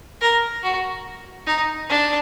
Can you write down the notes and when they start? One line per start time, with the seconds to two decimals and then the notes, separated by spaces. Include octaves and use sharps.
0.21 A#4
0.63 F#4
1.47 D#4
1.90 D4